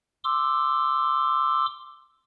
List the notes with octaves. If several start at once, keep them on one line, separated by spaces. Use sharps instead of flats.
C6 D6 E6